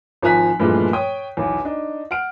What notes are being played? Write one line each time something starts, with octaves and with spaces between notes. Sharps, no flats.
G#1 F3 G#5 A#5 F#6 B6
G2 A#2 E3 F3 G#3 A3
C#5 G5 D#6
B1 E2
D4 D#4
F#5 F6 D7